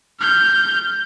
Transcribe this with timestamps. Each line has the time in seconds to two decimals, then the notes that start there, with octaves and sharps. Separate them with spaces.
0.20 F6 G6